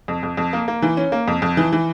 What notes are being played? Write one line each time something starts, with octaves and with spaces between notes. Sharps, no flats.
F2
F2
F2
A#3
A#3
E3
C#4
A#3
F2
F2
E3
E3